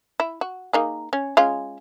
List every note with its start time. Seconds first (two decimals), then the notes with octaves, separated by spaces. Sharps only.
0.20 E4
0.41 F#4
0.73 A#3 D#4 G#4
1.13 C#4
1.37 G#3 C#4 F4